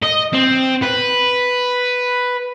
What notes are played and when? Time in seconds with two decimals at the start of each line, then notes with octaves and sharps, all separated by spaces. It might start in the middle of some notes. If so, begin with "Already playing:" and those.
0.03 D#5
0.33 C4
0.82 B4